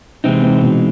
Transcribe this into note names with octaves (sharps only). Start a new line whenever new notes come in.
C3 E3 G#3 C4 D#4
C3
B2